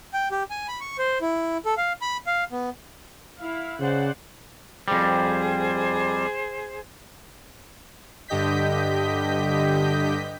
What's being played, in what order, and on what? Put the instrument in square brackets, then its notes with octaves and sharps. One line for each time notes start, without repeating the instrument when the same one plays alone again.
[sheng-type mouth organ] G5
G4
G#5
B5
C#6
C5
E4
A4
F5
B5
F5
B3
[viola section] E4 F5
[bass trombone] C#3 [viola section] C5 D5 F#5
[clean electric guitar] F2 G3 [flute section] G#4 C5
[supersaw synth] G2 D3 G4 D#5 G6 B6